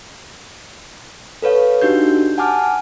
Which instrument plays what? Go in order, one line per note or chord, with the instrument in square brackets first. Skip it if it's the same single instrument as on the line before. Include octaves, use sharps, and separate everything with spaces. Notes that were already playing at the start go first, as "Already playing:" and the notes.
[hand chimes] A4 B4 C#5 F5
D4 D#4 F#4 G4 G6
F#5 G#5 A5 D6 F6